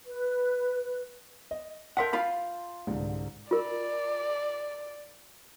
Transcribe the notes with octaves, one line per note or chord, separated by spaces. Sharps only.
B4
D#5
A#4 E5 F#5 A5 C6 G6
F4 F5 B5
C2 G#2 D3
F4 A#4 D5